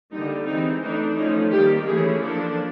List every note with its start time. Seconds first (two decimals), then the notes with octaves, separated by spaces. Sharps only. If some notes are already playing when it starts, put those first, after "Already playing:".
0.11 D3 G3 A#3 D#4
0.46 E3 G#3 C4 D#4
0.82 E3 A3 D4 D#4
1.16 F3 A3 C#4 D#4
1.50 D#3 G3 A#3 G4
1.85 E3 A3 C#4 G#4
2.20 F3 A#3 D4 A4